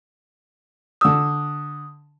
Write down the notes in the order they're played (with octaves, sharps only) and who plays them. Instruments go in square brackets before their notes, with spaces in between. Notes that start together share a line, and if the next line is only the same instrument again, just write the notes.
[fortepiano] D3 E6 [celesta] D#6